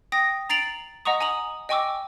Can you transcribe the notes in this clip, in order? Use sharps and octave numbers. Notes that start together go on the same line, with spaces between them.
G5 D#6 A#6
A#5 A6 C7 D7 F7 F#7
D#5 F#5 A#5 C#6 D#6
G#5 A#5 D#6 F#7
D#5 G5 G#5 C#6 D6 E6